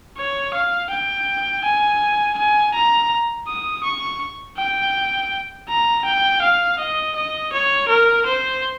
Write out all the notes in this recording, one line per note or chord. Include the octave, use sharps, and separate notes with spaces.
C#5
F5
G5
G#5
G#5
A#5
D#6
C#6
G5
A#5
G5
F5
D#5
D#5
C#5
A#4
C5